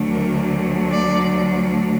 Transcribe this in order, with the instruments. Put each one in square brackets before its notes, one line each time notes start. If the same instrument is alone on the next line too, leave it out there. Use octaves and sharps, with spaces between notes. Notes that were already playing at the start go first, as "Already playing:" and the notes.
Already playing: [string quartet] D2 D3 F#3 A3
A#4
D5